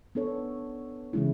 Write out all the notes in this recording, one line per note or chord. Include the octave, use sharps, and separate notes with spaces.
B3 D4 A4 C#5
C#3 E3 G#3 C#4 E4